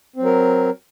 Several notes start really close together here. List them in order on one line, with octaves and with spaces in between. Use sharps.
C4 F#3 A#4